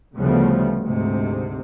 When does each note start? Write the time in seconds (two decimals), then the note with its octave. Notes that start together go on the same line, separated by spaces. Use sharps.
0.16 D2 C#3 F3 G3 A3 B3
0.82 D2 G#2 C3